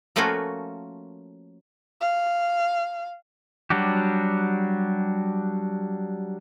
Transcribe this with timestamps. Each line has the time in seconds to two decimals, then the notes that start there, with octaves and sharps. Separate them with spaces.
0.16 F3 A3 A#3 C#4 F4 F#4
2.01 F5
3.70 F#3 G3 D4 F#4 G4